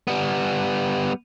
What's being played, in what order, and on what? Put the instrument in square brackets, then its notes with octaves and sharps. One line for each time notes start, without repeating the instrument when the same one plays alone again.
[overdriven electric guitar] G3 B3